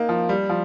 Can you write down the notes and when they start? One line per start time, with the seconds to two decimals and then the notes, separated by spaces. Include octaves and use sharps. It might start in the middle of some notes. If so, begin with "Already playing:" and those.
Already playing: A#3 D#4
0.09 F3
0.29 G3
0.49 F3